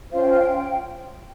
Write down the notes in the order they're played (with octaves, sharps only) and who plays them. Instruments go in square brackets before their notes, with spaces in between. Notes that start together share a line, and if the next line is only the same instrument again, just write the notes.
[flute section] C#4 F4 C5 F5
G5
F5
G5
F5
G5